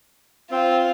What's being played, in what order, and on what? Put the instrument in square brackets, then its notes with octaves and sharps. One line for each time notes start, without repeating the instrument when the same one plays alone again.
[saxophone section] C4 [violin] F4